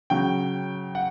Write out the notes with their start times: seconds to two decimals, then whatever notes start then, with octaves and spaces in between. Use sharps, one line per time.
0.10 C#3 F#3 G5
0.95 F#5